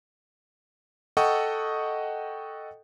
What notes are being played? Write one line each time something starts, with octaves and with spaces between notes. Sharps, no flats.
A4 D#5 F#5 G5 C#6 D#6